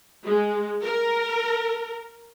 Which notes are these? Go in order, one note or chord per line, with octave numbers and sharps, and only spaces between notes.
G#3
A#4